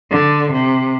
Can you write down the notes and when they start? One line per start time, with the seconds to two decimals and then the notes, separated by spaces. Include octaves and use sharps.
0.11 D3
0.52 C3